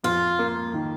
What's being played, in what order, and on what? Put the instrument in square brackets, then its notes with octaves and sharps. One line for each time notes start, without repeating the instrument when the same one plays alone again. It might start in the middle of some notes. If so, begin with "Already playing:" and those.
[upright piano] F2 [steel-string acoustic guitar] F4
[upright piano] A#3
D#3